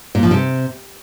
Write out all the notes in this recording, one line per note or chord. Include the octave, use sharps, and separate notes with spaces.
A#2
F3
C3